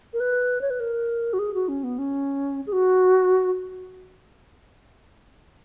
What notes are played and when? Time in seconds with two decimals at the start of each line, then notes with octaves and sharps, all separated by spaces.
0.13 A#4
0.20 B4
0.61 C#5
0.70 B4
0.80 A#4
1.33 F#4
1.39 G#4
1.54 F#4
1.68 C#4
1.83 B3
1.98 C#4
2.67 G#4
2.72 F#4